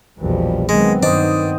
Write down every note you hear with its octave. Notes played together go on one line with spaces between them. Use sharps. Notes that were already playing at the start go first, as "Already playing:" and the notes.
A#1 E2 B2 F3 G3
D#3 F#3 G#3 B3 C4
G2 D#3 D4 C5 D#5